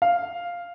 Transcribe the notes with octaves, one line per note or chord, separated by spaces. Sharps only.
F5